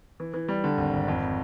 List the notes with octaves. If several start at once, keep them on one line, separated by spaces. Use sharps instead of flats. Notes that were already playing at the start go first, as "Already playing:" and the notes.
E3
E3
G3
D3
G#1
G#1
F2